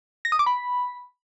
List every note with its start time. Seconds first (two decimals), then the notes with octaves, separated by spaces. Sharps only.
0.25 A#6
0.32 D#6
0.39 D6
0.46 B5